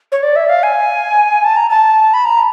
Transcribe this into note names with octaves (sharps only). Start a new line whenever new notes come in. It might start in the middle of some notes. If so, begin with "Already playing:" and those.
C#5
D5
E5
F5
G#5
A5
A#5
A5
B5
A#5